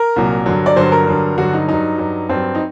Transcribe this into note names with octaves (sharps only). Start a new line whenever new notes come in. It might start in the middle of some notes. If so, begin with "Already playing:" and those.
Already playing: A#4
C2 A#2 F#3
G2 D3 F#3
D5
G2 D3 F#3 C5
A#4
G2 D3 F#3
G2 D3 F#3 F#4
D#4
G2 F#3 D#4
G2 F#3
G2 F#3 C4
D#4